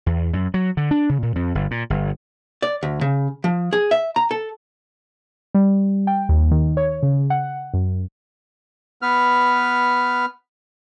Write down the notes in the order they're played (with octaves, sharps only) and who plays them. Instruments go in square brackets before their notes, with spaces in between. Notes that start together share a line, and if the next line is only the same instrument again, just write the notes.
[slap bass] E2
F#2
F#3
D3
D4
C#3
A#2
F2
G1
A#2
G1
[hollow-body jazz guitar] D5
D2
C#3
F3
G#4
E5
A#5
A4
[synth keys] G3
G5
D#2
D#3
C#5
C#3
F#5
F#2
[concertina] B3 B4 F6